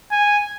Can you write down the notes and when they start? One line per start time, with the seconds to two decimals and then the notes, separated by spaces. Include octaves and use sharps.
0.12 G#5